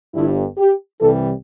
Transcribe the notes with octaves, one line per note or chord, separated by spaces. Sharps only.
G1 G2 G3 E4
G4
C2 C3 E3 G3 A4